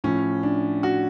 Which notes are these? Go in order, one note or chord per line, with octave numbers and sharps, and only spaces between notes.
A2 F3 C#4
D4
F#4